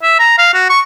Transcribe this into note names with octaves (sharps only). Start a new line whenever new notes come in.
E5
A#5
F5
F#4
C#6